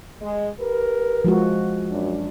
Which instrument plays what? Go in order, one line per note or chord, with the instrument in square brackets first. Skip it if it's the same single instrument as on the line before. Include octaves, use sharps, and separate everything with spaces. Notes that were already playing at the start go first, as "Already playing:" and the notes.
[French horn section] G#3
G4 A#4 B4
[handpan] F3 G#3 F#4
[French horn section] F#2 D4